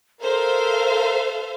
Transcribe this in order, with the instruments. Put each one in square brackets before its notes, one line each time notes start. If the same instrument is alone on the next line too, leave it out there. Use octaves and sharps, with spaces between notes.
[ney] A4 [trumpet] A#4 [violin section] C5 E5 F5